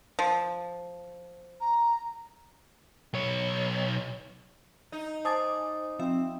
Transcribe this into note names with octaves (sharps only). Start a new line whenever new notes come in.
F3
A#5
B1 C#5
D#4
C5 G#5 A5 D6 D#6 A6
F3 C4 E5